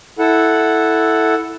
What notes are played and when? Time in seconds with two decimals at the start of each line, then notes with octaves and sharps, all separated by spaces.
0.19 E4 A4 F#5